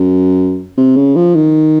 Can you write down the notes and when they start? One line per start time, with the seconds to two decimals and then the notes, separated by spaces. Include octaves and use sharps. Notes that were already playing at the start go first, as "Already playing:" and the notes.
Already playing: F#2
0.77 C3
0.96 C#3
1.15 F3
1.35 D#3